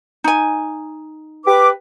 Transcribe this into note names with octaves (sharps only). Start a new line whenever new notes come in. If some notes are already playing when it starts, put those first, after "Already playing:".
D#4 G#5
G4 B4 D6